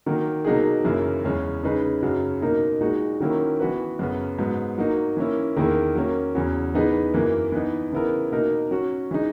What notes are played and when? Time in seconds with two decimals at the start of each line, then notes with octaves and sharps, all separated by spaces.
0.06 D#3 F#3 A#3
0.45 B2 F#3 A#3 D#4 G#4
0.84 F#2 C#3 E3 A#3 E4
1.24 E2 C#3 G#3 C#4
1.63 C#3 G#3 D#4 G#4 B4
2.02 F#2 C#3 F#3
2.41 B2 A#3 D#4 A#4
2.80 A#2 G#3 D#4 F#4
3.21 D#3 F#3 A#3 C#4 E4
3.60 E3 B3 F#4 B4
3.99 F#2 C#3 F#3 B3
4.39 G#2 F#3 B3
4.78 F#3 A#3 D#4 F#4
5.17 E3 A#3 C#4 E4
5.56 E2 D#3 A#3 E4 G#4
5.95 F#3 A#3 C#4
6.35 E2 C#3 F#3
6.75 E3 B3 D#4 G#4 B4
7.14 F#2 E3 A#3
7.52 E3 B3 D#4
7.92 C#3 E3 B3 E4 A#4
8.32 B2 A#3 D#4 A#4
8.71 F#3 C#4 F#4
9.11 E3 G#3 D#4